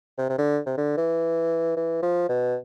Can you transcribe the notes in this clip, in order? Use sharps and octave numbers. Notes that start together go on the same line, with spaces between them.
C3
C3
D3
C3
D3
E3
E3
F3
B2